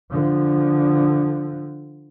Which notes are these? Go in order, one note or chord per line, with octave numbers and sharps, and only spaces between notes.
D3 F3